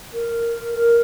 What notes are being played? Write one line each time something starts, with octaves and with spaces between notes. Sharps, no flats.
A#4
A#4